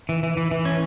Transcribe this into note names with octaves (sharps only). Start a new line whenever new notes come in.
E3
E3
E3
E3
C#4